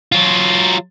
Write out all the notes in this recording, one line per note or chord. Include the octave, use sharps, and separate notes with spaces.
F#3 F4